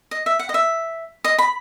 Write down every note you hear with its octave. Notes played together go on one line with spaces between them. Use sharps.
D#5
E5
F#5
D#5
E5
D#5
B5